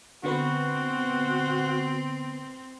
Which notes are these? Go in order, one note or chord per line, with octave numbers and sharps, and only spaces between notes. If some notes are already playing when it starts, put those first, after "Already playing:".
D3 B3 C4 F#4 B4